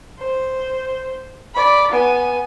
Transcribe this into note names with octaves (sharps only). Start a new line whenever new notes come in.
C5
D5 B5
B3 G#5